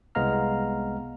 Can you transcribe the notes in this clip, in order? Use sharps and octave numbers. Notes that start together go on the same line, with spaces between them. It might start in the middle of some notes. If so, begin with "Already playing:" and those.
C2 G#3 B3 F5 A#5 F6